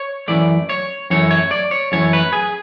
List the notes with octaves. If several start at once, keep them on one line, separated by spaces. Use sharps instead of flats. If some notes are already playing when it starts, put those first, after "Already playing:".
Already playing: C#5
F#2 C#3 E3 A3 D5
C#5
F#2 E3 A3 C#5
C#5
D5
C#5
F#2 E3 A3 C#5
B4
G#4